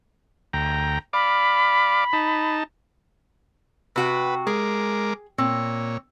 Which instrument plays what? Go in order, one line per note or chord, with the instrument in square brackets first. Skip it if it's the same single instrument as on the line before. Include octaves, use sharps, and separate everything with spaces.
[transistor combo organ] D2 G5 A#5
[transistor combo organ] D5 F5 D6 [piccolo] B5
[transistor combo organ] D#4 A5
[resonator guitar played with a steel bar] C3 F#4 G5 [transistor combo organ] B4
[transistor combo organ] G#3 A#4 D6 [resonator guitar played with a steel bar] G#4
[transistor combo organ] A#2 C#5 [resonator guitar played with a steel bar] C4